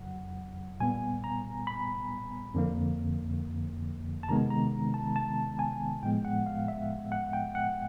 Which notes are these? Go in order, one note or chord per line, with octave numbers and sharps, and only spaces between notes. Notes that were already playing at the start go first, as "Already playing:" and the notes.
Already playing: F2 C#3 F#3 F#5
A#2 G3 B3 G#5
A#5
B5
F2 D3 F3 A#3
A5
C3 D#3 G#3 B3 A#5
A#5
A5
A5
G#5
A2 F3 G#3 B3 G5
F#5
F5
E5
F#5
G5
F#5